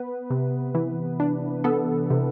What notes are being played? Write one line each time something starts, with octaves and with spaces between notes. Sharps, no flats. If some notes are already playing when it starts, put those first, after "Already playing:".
Already playing: B3 B4
C3
E3
D4
B3 A4
C3